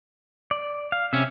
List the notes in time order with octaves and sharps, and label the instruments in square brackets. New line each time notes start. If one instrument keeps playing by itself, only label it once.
[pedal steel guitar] D5
F5
[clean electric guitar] C3 C#4 [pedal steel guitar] E5